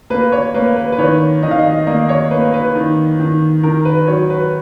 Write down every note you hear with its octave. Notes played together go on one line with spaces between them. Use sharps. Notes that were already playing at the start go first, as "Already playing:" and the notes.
A#3 B4
C#5
A#3 B4
B4
B4
D#3 C#5
D#3 D#5
F5
D#5
A#3 D#5
C#5
A#3 B4
B4
D#3
D#3
D#3 A#4
B4
F#3 C#5
B4